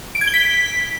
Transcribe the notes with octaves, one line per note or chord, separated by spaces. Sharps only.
D7
G#6
G7
B6